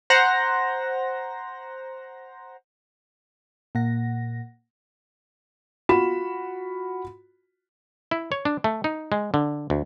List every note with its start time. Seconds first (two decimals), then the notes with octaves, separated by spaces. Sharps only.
0.10 C5 F#5 A#5 A#6
3.75 A#2 A#3 F#5 A#6
5.89 F4 F#4 B5 E7
8.11 E4
8.32 C#5
8.45 D4
8.64 A3
8.84 D#4
9.12 G#3
9.34 D3
9.70 D2